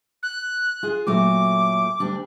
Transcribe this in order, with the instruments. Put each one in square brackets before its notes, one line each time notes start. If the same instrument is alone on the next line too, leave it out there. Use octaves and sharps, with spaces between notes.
[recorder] F#6
[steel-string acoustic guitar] F4 G#4
[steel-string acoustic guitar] A#2 F#3 A3 [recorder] D6
[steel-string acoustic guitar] D2 G3 D4